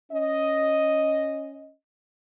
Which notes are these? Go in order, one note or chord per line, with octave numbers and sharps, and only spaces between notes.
C#4 D#5